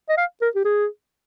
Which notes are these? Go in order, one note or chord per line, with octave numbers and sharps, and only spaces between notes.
D#5
F5
A#4
G4
G#4